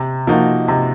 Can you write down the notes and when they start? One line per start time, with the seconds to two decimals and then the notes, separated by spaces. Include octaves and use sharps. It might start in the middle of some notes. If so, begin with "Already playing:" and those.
Already playing: C3
0.27 F3 A#3 D#4 F#4
0.68 C3